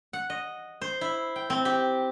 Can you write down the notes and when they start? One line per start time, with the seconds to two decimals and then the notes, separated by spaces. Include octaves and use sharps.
0.13 F#5
0.30 D#5
0.81 C5
1.01 E4
1.36 G5
1.50 C4
1.65 G4